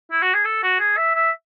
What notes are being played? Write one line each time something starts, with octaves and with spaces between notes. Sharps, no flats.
E4
F#4
G#4
A4
F#4
G#4
E5
E5